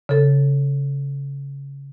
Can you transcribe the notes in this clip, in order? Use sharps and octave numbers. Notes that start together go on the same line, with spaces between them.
C#3 A4